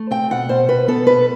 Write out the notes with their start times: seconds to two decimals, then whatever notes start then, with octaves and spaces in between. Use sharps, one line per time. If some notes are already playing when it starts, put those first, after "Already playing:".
Already playing: A3
0.11 C4 G5
0.30 B2 F#5
0.49 B2 C5
0.68 B2 B4
0.88 B3 A4
1.07 B2 B4